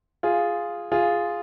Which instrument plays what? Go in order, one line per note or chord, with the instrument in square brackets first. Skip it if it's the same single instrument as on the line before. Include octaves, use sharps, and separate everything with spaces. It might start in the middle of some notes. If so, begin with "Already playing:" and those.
[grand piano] F4 G#4
F4 G#4